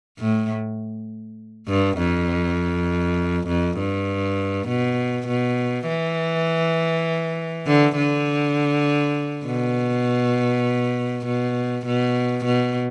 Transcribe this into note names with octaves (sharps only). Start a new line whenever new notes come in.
A2
G2
F2
F2
G2
B2
B2
E3
D3
D3
B2
B2
B2
B2